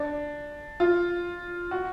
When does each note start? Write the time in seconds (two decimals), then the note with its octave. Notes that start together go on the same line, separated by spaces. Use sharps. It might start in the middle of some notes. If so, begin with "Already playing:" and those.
Already playing: D4
0.80 F4
1.71 F#4